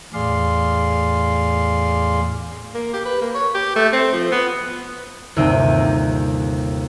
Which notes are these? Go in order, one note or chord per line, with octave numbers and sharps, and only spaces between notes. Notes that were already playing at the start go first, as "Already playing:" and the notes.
E2 A2 G#4 D5 F5 C6
A#3
G4
B4
A#3
C#5
G4
A3
C4
F3
B3
G1 D#2 C3 E5 G5 D#7